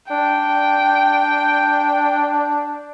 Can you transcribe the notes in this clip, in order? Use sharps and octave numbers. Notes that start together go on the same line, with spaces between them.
D4 G5